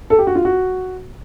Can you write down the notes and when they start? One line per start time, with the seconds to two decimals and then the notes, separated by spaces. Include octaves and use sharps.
0.10 A4
0.19 G4
0.27 F#4
0.35 F4
0.45 F#4